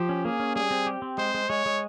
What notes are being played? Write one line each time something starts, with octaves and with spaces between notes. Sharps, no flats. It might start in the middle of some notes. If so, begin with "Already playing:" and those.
Already playing: F3 G4
C#4
A#3 G#4
C#4
G3 G#4
C4
G4
C4
G#3 C5
G#3
G#3 C#5
G#3